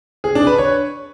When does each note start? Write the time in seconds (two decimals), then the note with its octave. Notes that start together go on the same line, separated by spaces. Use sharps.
0.24 G#4
0.35 D4
0.47 B4
0.58 C#5